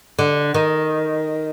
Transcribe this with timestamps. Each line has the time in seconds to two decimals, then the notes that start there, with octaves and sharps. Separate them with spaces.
0.19 D3
0.54 D#3